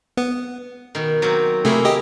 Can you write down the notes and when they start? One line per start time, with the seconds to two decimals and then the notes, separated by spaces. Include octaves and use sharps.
0.17 B3
0.95 B2 D#3
1.22 F#3 A#3 C4
1.65 C3 A3 A#3 E4 G#4
1.85 G4 D#5